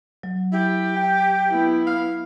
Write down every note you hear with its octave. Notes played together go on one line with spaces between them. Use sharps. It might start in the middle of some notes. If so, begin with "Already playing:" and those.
F#3
E4 G4
G5
B3 E4
F5